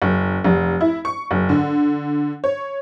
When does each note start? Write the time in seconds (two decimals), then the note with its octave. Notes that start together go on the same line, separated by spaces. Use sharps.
0.02 F#1
0.45 F1
0.81 E4
1.05 C#6
1.31 F#1
1.49 D3
2.44 C#5